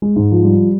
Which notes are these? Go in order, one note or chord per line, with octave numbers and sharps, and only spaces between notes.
G#3
G#2
F3
G3